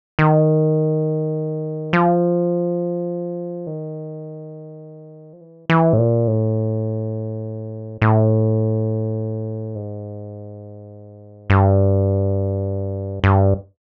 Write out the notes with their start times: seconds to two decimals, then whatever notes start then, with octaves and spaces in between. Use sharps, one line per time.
0.19 D#3
1.93 F3
3.67 D#3
5.33 F3
5.41 E3
5.70 E3
5.93 A2
5.99 A#2
6.28 A2
8.02 A2
9.75 G#2
11.50 G2
13.24 G2